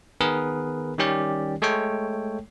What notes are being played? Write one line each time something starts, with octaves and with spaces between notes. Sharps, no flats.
D#3 B3 G#4 A#4 B4
D#3 G3 C#4 G4 D5
G#3 A3 A4 C#5 G5